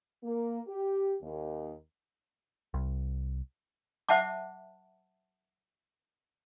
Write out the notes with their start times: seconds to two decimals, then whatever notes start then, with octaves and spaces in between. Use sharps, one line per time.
0.24 A#3
0.68 G4
1.22 D#2
2.74 C2
4.09 C5 E5 F#5 A5 D6